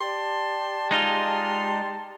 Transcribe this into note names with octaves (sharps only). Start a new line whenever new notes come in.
G4 D5 A5 C6
G#3 D#4 F4 C6